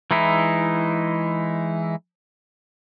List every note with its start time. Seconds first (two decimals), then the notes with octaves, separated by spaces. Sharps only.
0.11 E3 G#3 D#4 E4